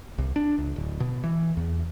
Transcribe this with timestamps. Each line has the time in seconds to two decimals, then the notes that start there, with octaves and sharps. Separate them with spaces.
0.18 C2
0.36 D4
0.58 C#2
0.76 D1
1.00 B2
1.24 E3
1.57 E2